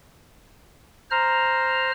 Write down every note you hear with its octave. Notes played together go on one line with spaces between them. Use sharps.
C5 A#5 F6